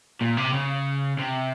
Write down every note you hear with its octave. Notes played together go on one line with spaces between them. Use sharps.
A#2
C3
C#3
C3